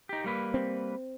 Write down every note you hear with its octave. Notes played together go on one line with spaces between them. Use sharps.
D#4 G4
G3 A#3 B4
C4